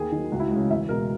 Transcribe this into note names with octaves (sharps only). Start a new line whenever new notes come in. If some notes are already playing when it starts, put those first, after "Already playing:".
Already playing: D#2 G#4
D#3 F#3
C#2 F#4
E4
F#4
C#3 G#3
E2 E5
B2 G#3 A#4